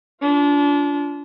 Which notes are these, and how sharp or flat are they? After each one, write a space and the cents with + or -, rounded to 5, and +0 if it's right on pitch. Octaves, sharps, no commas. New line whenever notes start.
D4 -30 F4 -5